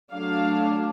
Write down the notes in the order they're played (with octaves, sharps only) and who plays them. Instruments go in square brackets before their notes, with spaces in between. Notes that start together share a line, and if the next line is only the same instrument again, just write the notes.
[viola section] F#3 A3 D4 F5